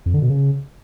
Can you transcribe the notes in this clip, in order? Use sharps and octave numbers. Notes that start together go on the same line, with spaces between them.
F2
D3
B2
C#3